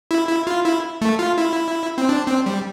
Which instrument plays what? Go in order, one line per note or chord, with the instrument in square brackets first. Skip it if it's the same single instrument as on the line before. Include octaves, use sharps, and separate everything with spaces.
[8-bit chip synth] E4
E4
F4
E4
A3
F4
E4
C4
D4
C4
G3